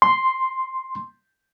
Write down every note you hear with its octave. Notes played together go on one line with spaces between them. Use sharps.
C6